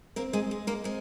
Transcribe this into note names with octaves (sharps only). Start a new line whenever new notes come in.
A#3 C4 A#4
G#3 G#4
G#3
A#3 A#4
G#3 C4